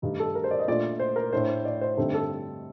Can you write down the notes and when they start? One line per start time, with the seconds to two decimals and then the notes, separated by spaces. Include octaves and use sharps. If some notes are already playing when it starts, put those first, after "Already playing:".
0.02 G2 D#3 A3 D#4
0.20 A4
0.35 A#4
0.44 C5
0.51 D5
0.59 D#5
0.68 A#2 A3 D4 D5
1.00 C5
1.16 A#4
1.33 A2 A3 D4 C5
1.65 D5
1.81 C5
1.97 G2 D3 A3 C4 D#4 A4
2.14 A4